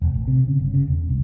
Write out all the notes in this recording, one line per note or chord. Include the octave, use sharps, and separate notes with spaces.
E1
A1
C3
C#3
G1
C#3
E1
C2